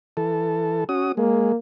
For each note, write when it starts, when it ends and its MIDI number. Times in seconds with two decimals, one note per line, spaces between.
0.17 0.84 52
0.17 0.84 69
0.89 1.12 61
0.89 1.12 66
0.89 1.12 87
1.17 1.52 56
1.17 1.57 58